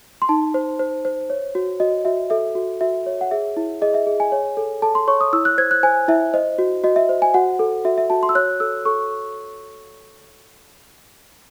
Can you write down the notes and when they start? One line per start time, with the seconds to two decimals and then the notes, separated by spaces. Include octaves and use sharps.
0.22 C6
0.29 D#4 A5
0.54 C5
0.79 C5
1.05 C5
1.30 C#5
1.55 F#4
1.80 F#4 D#5
2.05 F#4 E5
2.30 A4 E5
2.55 F#4
2.81 F#4 E5
3.06 C#5
3.21 F#5
3.31 G#4 E5
3.57 E4
3.81 G#4 D#5
3.94 E5
4.07 G#4
4.20 G#5
4.32 C#5
4.57 A4
4.82 A4 A5
4.95 C6
5.08 C#5 C#6
5.21 D#6
5.33 E4 E6
5.45 F#6
5.58 C5 G#6
5.71 F#6
5.83 C5 G#5
6.08 E4 E5
6.34 C5 D#5
6.58 F#4
6.84 F#4 D#5
6.96 E5
7.09 C5
7.22 G#5
7.34 F#4 F#5
7.59 A4
7.85 F#4 E5
7.98 E5
8.10 F#4 A5
8.23 C6
8.29 E6
8.35 C#5 F#6
8.60 A4 E6
8.85 A4 C#6